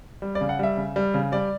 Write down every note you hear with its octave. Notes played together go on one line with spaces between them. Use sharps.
G3
D5
C#3
F#5
G3 E5
C#3
G3
C#3
G3 D5